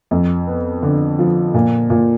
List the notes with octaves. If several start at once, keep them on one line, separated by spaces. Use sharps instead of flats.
F2
B3
D3
F3
A#2
A#2